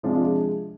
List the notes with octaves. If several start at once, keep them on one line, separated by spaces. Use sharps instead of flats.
C3 F3 G#3 D4 F4
F4
G#4